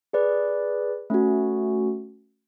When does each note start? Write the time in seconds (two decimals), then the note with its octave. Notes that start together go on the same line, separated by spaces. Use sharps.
0.13 G#4 B4 D5
1.10 A3 C#4 F#4